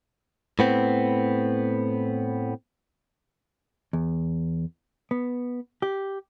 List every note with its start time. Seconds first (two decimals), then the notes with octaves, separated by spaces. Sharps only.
0.59 A2 B3 C4
3.93 E2
5.11 B3
5.82 G4